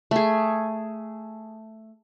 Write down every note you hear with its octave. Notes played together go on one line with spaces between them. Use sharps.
A3 G#4